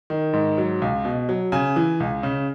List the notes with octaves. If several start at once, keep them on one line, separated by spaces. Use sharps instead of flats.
D#3
G#2
F#3
C#2
B2
F#3
C#3 G#5
E3
C#2
C#3